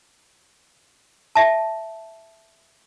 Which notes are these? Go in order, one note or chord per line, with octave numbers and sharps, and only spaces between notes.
E5 A5